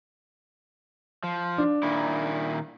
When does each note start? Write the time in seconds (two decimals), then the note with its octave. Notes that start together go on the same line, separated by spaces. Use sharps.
1.23 F3
1.58 D4
1.83 A#2 D#3 E4